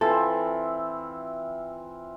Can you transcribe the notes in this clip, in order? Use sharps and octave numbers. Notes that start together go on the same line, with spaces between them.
E3 C4 F4 A4